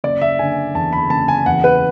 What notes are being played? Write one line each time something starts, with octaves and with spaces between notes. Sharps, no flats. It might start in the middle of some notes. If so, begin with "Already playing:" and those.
F#1 D5
E5
D3 G#5
E2 A5
B5
F#1 A5
G#5
E2 F#5
B4